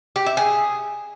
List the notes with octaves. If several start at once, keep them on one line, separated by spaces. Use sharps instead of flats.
G4
E5
G#4